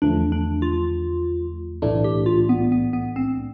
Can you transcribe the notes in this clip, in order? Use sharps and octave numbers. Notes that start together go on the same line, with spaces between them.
E2 D3 F3 A3 D4
D4
F4
B1 A2 E3 A3 D4
G4
F4
B3
B3
B3
C4